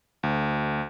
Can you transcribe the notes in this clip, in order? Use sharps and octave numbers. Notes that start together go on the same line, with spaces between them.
D2